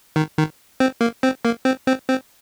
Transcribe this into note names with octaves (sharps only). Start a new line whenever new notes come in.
D#3
D#3
C4
A#3
C4
A#3
C4
C4
C4